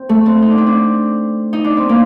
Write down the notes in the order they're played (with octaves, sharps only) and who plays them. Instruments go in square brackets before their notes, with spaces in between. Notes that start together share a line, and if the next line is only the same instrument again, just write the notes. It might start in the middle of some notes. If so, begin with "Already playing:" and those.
Already playing: [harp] C4
A3
C4
D#4
D4
C4
D4
D#4
D4
C4
A#3